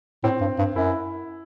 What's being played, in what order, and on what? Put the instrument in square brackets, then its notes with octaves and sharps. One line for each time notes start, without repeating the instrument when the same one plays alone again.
[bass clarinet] A2 [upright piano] C4
[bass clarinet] G2
G2
[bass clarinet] F#2 [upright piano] E4